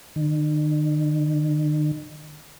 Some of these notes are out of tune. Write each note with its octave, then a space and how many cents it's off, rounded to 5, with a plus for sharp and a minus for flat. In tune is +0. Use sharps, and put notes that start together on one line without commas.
D#3 -45